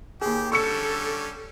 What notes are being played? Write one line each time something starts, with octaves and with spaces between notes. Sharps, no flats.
D#2 G4 G#4
D3 G3 C#4 A4 C#6 E6 C#7